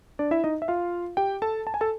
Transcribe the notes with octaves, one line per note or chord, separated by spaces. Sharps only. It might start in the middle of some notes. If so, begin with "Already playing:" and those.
D4 D5
E4 E5
D#4 D#5
E5
F4 F5
G4 G5
A4 A5
A5
G#5
A4 A5